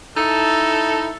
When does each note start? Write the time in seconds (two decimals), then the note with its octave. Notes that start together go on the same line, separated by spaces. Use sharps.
0.17 D#4 E4 A4